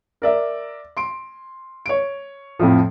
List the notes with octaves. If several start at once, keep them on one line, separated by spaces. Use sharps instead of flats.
A#4 D5 E5
C6 D7
C#5 D7
F2 A2 F3